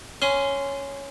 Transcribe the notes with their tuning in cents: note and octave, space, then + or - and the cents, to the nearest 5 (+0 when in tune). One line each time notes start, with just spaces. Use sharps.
C#4 +0 C6 -20 D#6 +15